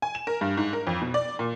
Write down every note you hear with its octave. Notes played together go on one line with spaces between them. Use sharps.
G#5
E7
A#4
G2
G#2
A#4
F2
B2
D5
A#2